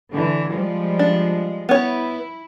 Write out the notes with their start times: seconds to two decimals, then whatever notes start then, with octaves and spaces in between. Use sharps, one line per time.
0.12 D3 E3
0.51 F3 G3 G#3
0.99 D4
1.69 B3 E4 C#5